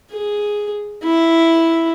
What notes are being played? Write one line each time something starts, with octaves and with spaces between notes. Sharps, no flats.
G#4
E4